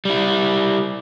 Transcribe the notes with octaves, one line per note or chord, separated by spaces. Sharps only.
G3 E4